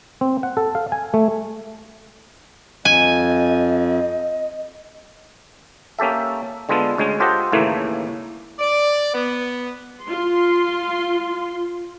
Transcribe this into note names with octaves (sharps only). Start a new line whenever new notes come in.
C4
F#5
A4
F5
G#5
A3
F2 D#5 G#5
A#3 C#4 G4 A4 E5
D3 G#3 B3 F4 A4
D2 G#3 C#4 G#5
F4 G4 A4 C5 D#5 F#5
D#2 A2 C#3 E3 A3 A#3
D5
B3
F4 C6